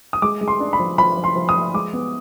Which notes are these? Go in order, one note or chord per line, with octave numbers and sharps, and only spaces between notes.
D#6
G#3 D6
G#3
C6
D4
B5
F3
F3 B5
F3
C6
F3
D#6
F3
G#3 D6
B3